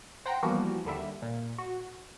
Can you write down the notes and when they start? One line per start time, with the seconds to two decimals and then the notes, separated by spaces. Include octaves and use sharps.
0.26 C5 F#5 G5 A#5 A#6
0.43 E3 F3 G3 A#3 B3 F#4
0.85 D#2 D3 G3 E5
1.22 A#2
1.58 F#4